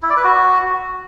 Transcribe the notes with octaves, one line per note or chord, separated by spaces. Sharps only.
E4
D5
B4
F#4